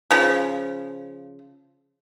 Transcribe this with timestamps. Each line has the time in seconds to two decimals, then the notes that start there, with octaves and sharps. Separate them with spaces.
0.11 C#3 F3